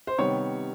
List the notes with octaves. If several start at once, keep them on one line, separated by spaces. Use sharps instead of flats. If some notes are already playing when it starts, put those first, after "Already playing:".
C5
C3 D#3 G3 B3 C#5